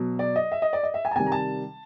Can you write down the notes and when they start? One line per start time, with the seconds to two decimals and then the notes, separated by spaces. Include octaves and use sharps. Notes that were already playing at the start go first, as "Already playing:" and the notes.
Already playing: B2 F#3
0.19 D5
0.36 D#5
0.52 E5
0.62 D#5
0.73 D5
0.83 D#5
0.94 E5
1.05 G#5
1.11 A5
1.16 C3 D#3 G3 G#5
1.26 A#5
1.32 A5